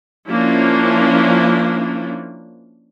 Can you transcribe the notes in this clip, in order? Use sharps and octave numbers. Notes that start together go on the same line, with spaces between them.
F3 A#3 C#4 D4 E4